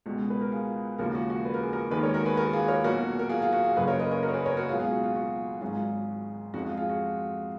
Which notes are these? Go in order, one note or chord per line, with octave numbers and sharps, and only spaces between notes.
C#2 B2 G#3 F#4
B4
A#4
F4 G#4
D#2 C#3 F3 G#3 F#4 A#4
F#4
F#4
B4
A#4
G#4
F#4 A#4
D#2 D#3 G#3 G#4 B4
A#4 C#5
F#4 A#4
G#4 B4
F#4 A#4
F4 G#4
A#4 C#5
B1 A#2 F#3 F#4 A#4
A#4
F4 G#4
F4
F#4
F4 G#4
F#1 F#2 C#3 F#3 G#4 B4
A#4 C#5
B4 D#5
A#4 C#5
F#4 A#4
C#5
G#4 B4
A#4 C#5
F#4 A#4
C#2 B2 F#3 F4 G#4
F4 G#4
F#4
F4
F#4
G#1 G#2 F#3 F4 G#4
F2 F3 G#3 F#4
F4
F4 G#4
F#4